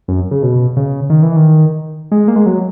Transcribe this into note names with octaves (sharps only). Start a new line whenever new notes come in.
F#2
C#3
B2
C#3
D#3
E3
D#3
G#3
A#3
G#3
F#3